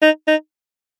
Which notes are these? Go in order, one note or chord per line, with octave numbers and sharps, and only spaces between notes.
D#4
D#4